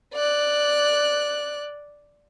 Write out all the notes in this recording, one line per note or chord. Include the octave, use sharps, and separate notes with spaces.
D5 F#6